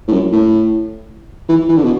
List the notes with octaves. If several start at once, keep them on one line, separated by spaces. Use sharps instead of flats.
A2
F#2
A2
E3
E3
D3
B2